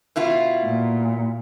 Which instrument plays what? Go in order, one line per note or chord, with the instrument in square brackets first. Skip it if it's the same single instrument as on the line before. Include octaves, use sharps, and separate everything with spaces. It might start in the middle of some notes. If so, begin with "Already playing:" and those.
[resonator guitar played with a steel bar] B2 E4 F4
[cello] A#2